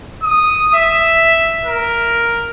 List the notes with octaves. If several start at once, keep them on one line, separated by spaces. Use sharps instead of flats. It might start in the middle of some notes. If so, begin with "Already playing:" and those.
D#6
E5
A#4